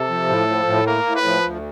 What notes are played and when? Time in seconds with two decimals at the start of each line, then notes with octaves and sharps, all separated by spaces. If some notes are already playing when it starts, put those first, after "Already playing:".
Already playing: C3 A4
0.09 F3
0.29 A2
0.48 F3
0.67 A2
0.86 A#3 A#4
1.06 A2
1.15 B4
1.26 F3
1.44 D2